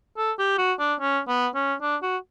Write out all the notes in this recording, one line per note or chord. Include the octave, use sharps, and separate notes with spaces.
A4
G4
F#4
D4
C#4
B3
C#4
D4
F#4